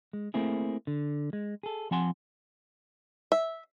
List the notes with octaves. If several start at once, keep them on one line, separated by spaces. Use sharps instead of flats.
G#3
A3 A#3 C4 E4 G#4
D3
G#3
G#4 A4
F3 C4 F#5 G#5 C6
E5